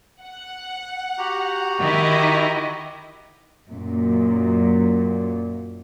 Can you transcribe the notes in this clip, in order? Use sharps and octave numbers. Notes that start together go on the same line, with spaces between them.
F#5
F#4 G4 A#5
D#3 E4 D#5
F#2 A#2